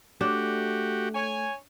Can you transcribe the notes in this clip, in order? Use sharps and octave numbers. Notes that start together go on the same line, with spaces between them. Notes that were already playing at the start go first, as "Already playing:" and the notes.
A3 D4 F#4 G4
C#5 G#5